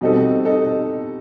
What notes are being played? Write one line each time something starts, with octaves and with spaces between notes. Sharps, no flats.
B2 G3 C4 D#4 A4
D#4 A4